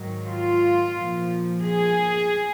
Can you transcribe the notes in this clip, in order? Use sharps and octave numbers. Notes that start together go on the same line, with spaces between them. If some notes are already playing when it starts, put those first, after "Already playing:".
Already playing: G#2 D#3 F#3
F4
A#2 F3
G#4